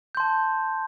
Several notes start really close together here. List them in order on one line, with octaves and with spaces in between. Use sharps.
G6 C6 A5